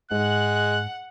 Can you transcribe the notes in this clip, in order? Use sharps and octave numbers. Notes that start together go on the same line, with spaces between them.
G#2 G#3 F#5 F#6